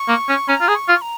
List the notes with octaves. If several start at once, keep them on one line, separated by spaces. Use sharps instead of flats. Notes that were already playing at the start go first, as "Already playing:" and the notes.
Already playing: C#6
A#3
C#4
C#4 A#5
F4
G#4
C#6
F4
C#6
A#5